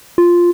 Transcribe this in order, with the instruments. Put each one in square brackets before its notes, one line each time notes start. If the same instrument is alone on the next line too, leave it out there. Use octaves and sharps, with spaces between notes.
[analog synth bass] F4